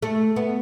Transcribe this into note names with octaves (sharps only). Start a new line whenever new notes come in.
A3
B3